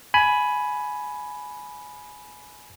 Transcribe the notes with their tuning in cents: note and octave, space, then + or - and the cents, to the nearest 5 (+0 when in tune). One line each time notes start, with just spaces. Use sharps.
G#5 +15 B5 +0